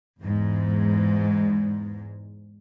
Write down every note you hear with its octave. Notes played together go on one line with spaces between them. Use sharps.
E2 G#2 G#3